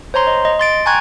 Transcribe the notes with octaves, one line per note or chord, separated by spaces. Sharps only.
C5 C#5 A#5 C6
D#5
D#5
C6 A6 D7
G5 G#5 A#5 C#6 F#6 G#6